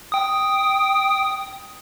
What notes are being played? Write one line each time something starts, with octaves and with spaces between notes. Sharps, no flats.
G5 D#6